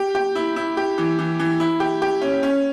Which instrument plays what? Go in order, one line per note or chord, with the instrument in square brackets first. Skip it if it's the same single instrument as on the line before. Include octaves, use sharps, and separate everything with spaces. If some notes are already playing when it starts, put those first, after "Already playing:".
Already playing: [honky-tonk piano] G4
G4
E4
E4
G4
E3
E3
E3
E4
G4
G4
C#4
C#4